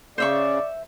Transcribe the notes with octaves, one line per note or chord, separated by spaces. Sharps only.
C#3 C5 D5 E5 C#6